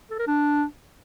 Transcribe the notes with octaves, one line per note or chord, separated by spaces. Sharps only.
A4
A#4
D4